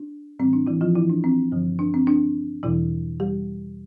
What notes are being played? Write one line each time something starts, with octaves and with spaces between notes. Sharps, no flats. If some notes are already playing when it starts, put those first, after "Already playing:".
Already playing: D4
A2 E3 G3 C4
D4
E3 E4
F3 F4
E3 E4
D4
C4
G2 D3 F3
D4
C4
D4
E2 B2 E3 G3 E4
G3 G4